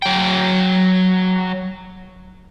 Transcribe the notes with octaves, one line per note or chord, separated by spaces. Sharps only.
F#3 G5